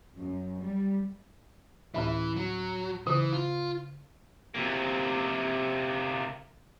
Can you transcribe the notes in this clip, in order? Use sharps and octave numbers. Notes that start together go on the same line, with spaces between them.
F#2
G3
D2 A2 E3 E5
F#3
C#3 E3
F4
C3 A#3